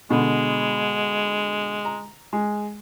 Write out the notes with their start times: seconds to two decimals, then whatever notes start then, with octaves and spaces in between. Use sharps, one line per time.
0.10 B2 D3 G#3
1.85 A#5
2.33 G#3